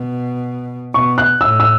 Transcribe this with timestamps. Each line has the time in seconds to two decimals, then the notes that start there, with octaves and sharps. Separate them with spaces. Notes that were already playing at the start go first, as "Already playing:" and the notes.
Already playing: B2
0.94 B2 C#6
1.18 F#6
1.41 A2 E6
1.60 E6